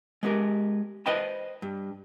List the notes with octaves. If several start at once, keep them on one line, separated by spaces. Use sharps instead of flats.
G#3 B3 G4 A#4
B4 C5 D#5 G5 A5 B5
G2